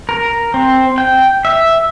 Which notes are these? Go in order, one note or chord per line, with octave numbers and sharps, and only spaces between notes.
A#4
C4
G5
E5